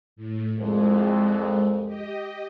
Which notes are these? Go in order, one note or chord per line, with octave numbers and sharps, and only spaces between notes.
A2
C2 F2 G#3
G4 D#5